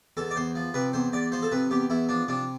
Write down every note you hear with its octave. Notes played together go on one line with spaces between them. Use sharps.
E2 A4
D5
E2 C5
F3
C3 B4
E2 C5
E2 D5
F3 C5
A4
C3 B4
E2 G4
E2 E4
F3 D4
C3 D4